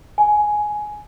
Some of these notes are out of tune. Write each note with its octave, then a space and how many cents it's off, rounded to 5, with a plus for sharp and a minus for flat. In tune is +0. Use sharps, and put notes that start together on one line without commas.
G#5 +10